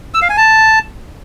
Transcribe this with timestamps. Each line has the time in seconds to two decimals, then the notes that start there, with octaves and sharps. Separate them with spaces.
0.14 E6
0.22 F5
0.30 G#5
0.37 A5